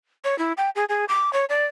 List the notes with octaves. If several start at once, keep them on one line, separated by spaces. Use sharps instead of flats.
C#5
E4
G5
G#4
G#4
D6
C#5
D5